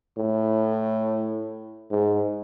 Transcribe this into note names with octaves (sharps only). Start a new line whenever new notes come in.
A2
G#2